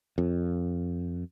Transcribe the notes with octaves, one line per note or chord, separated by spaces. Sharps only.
F2